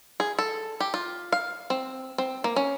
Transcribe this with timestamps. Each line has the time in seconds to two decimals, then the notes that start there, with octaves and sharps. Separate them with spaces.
0.20 G#4
0.39 A4
0.80 G4
0.94 F4
1.32 F5
1.70 C4
2.18 C4
2.44 A#3
2.56 C#4